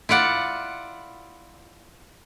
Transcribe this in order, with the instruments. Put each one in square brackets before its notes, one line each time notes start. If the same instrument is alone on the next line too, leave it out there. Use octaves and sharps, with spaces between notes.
[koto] E4 F4 D5 F#5